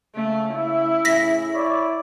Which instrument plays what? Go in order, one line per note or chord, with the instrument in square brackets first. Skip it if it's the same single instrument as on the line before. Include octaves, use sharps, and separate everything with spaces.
[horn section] C#3 [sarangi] A3
[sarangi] E4 [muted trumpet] E5
[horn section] A2 C#3 [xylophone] A#6 B6
[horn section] E4 D5 [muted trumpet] C#5